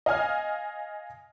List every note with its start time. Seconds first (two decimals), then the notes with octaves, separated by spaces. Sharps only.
0.06 D#5 F5 G#5 F6